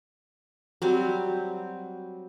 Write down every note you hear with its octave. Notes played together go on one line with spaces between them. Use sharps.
F#3 G3 C4